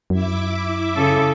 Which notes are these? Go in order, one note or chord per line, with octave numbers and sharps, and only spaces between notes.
F#2 E4 E5 D6
C#3 A4